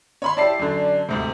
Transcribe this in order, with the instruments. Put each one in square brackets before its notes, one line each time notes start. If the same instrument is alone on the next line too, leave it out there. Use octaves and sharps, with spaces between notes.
[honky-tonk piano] C#5 B5 C6
[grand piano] E4 G4 [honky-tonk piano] D5 A5 C7
[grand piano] F#2 D3
D2 G#2 C3